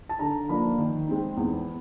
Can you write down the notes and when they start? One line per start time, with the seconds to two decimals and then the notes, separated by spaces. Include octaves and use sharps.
0.09 A5
0.19 D3 A#5
0.49 F3 A#3 D4 B5
0.78 D#3
1.07 G#3 C4 D#4
1.37 E2